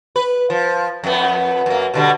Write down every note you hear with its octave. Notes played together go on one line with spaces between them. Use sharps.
B4
F3
F2 B3
F#2 A#3
B2 D3 G3